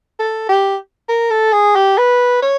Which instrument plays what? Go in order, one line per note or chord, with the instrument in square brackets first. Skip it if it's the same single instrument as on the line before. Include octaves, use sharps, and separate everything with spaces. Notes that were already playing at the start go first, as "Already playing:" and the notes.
[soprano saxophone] A4
G4
A#4
A4
G#4
G4
B4
C#5